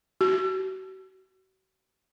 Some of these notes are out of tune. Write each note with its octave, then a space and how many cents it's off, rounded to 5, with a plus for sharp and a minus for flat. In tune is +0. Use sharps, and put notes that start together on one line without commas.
F#4 +35